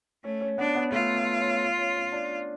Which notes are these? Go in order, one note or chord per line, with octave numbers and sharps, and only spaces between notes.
A3 C#4
C#4
B3 D4
B3
A3 F4
B3
C#4
C#4
C#4
D4